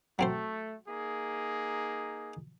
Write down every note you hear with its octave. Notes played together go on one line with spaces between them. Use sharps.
F#3 A3 C4 C5
A#3 D#4 G#4